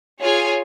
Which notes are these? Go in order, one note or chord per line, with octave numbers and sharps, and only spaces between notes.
F4 G#4 C#5 G#5